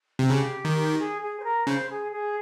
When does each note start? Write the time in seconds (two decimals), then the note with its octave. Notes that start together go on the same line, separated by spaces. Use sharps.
0.19 C3
0.30 C#3 G4
0.65 D#3
0.99 G#4
1.22 G#4
1.39 C5
1.44 A#4
1.67 C#3 C5
1.90 G#4
2.12 G#4